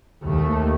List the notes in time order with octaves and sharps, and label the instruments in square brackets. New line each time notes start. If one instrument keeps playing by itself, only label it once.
[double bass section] D#2 A3